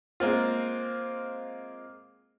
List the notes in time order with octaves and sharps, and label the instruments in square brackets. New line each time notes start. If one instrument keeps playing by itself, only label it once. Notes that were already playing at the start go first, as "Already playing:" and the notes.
[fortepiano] G#3 A#3 C4 F4